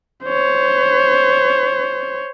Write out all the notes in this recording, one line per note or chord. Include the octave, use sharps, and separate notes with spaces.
C5 C#5